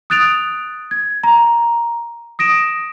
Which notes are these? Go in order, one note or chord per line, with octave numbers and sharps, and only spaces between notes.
D#6 F#6 A6 D7 F7
G#6
A#5
D#6 A#6 D7 E7